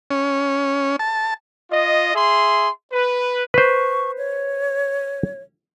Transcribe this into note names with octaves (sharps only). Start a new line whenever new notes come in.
C#4
A5
F4 D#5
G#4 E5 C6
B4
B4 C5 C#6
C#5